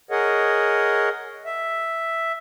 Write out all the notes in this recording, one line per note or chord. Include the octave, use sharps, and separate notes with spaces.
G#4 A#4 C#5 D#5 F#5
E5